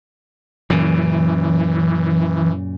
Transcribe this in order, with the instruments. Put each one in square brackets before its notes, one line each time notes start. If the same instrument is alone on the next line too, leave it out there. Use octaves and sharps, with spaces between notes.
[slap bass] F#2 A#2 C#3 [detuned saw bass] E3